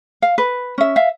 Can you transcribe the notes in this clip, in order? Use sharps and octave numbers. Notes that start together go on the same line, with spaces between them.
F5
B4
C#4 E5
E5 F5